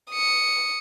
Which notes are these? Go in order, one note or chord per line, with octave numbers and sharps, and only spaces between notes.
D#6 C#7